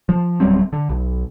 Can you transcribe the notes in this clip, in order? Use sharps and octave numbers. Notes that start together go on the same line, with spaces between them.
F3
D1 F#3 G3 C4
D3
B1